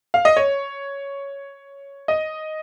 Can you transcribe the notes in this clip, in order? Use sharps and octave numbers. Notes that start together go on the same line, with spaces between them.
F5
D#5
C#5
D#5